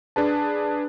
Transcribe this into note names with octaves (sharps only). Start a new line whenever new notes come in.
D4 G#4 B4 A5